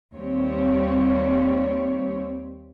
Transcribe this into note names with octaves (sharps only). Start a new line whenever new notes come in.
D#2 G3 C4 C#5